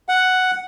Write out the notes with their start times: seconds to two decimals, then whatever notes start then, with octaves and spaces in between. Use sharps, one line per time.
0.09 F#5